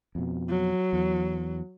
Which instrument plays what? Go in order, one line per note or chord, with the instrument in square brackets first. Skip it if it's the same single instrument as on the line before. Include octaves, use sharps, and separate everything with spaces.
[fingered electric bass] F2 B2
[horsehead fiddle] F#3
[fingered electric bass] E2